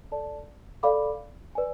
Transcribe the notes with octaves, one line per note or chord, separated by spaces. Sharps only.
A4 D5 A5
A4 D5 F5 B5 D6
B4 D5 G#5